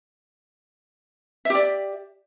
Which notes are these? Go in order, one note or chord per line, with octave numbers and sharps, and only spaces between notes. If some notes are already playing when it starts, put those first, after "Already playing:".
G4 D5 E5